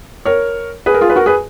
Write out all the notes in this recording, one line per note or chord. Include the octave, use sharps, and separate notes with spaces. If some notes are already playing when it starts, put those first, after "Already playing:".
A#4 C#5
G#4 B4
A#4
F4 G#4
B4
F#4 A#4
G#4 B4